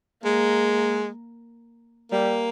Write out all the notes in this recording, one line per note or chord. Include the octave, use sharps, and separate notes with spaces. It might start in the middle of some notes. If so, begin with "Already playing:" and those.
G#3 A#3
G3 A#3